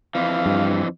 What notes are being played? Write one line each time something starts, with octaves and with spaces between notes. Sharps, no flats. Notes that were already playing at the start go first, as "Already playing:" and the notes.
F2 E3 F5
G2